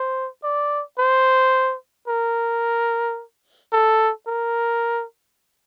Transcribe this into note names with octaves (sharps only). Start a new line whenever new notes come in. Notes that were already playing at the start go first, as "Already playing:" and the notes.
Already playing: C5
D5
C5
A#4
A4
A#4